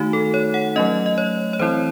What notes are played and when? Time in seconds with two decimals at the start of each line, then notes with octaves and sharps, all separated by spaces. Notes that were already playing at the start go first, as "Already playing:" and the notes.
Already playing: D#3 A3 D#4 F#4
0.13 A4
0.34 C#5
0.54 F#5
0.76 F#3 A3 C#4 D#5
1.06 D#5
1.18 C#5
1.53 C#5
1.59 E3 C4 E4 C5